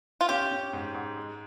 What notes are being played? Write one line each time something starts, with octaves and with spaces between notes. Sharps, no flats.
F4
C#4 G4
C#4
G#2
G#2
G#3